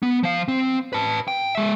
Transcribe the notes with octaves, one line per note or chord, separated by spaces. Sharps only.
B3
F3 F5
C4
B4 A5
G5
G#3 E5